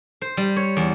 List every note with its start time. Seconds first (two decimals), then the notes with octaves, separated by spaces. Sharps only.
0.22 C5
0.37 G3
0.56 C#5
0.77 E2